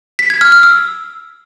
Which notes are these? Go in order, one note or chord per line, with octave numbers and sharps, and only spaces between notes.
B6
G#6
F6
F6
E6